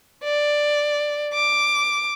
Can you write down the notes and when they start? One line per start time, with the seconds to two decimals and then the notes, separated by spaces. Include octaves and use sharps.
0.24 D5
1.34 D6